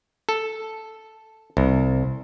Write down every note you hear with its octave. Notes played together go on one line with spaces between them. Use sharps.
A4
C2